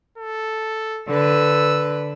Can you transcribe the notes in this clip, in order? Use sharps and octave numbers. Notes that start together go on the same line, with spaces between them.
A4
D3 B4 E6